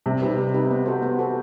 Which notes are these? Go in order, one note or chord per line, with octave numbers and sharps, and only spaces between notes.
C3 G3
C4 D#4 G4 B4
G3
C4 D#4 G4 B4
B3
F#4 A4 C5
B3
F#4 A4 C5